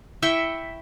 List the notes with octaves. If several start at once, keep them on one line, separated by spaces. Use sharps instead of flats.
E4 E5 G5 C#6